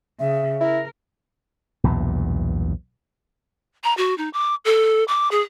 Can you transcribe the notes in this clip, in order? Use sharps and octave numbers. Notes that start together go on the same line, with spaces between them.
C#3 E5
E4 A#4
B1 E2 G2 A#2
A#5
F#4
D#4
D6
A4
D6
G#4